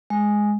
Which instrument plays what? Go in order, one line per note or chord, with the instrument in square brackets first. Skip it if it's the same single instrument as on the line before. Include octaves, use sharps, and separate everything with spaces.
[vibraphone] G#3